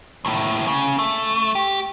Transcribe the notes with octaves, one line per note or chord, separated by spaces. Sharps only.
D#2 A2
C#3
A3
G4